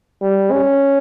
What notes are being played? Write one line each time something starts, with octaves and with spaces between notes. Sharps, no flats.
G3
C#4